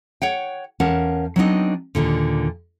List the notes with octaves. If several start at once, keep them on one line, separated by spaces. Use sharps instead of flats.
C#5 F#5 G5
E2 C#4 A#4 F5 F#5 A5
F#3 B3 C4 D4 D#4 D#5
D#2 A#2 D3